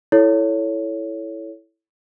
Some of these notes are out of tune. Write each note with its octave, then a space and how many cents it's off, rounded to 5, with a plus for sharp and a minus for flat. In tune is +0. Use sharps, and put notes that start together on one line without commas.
E4 +0 A4 -5 C#5 +10